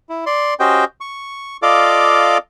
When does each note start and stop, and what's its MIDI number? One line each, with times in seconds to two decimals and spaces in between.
0.09 0.25 64
0.26 0.54 74
0.26 0.54 84
0.60 0.85 61
0.60 0.85 66
0.60 0.85 67
0.60 0.85 72
0.60 0.85 75
0.60 0.85 79
1.01 1.57 85
1.62 2.38 65
1.62 2.38 69
1.62 2.38 74
1.62 2.38 75
1.62 2.38 77
1.62 2.38 86